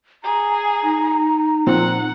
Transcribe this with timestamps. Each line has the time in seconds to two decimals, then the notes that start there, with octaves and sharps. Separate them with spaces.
0.24 G#4 A#5
0.83 D#4
1.67 A#2 F3 C4 D#4 F#5